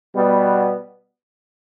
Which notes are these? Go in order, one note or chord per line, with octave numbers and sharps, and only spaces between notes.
B2 G3 B3